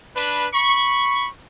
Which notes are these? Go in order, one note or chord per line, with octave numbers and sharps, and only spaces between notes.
D4 B4
B5 C#6